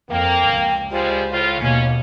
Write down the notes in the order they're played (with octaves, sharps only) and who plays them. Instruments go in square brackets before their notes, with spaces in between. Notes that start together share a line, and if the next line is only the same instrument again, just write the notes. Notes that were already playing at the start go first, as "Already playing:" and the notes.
[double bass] F2 [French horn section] A#3 [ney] G5
[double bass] C#2
[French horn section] G3 G#3 F4 [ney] C5
[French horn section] A2 F4
[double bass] D#2 B2 [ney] A#3 [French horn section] C#4